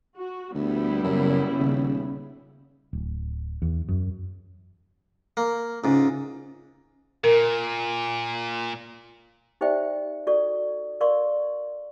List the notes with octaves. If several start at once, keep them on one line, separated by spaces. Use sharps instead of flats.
F#4
D2 G3 B3 E4
F#2 C#3
D#1
D1
E2
F#2
A#3
C#2 G#2 C#4
A#2 A#4
D#4 G4 C5 D5 E5 G5
F#4 A4 D5 C#6
A#4 D5 F5 C6 C#6